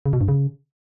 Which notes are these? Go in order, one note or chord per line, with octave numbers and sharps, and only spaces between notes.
C#3
B2
G2
C#3